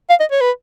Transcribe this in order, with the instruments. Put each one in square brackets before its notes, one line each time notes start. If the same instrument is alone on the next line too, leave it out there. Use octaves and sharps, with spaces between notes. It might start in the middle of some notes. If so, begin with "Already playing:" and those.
[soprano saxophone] F5
D#5
C#5
B4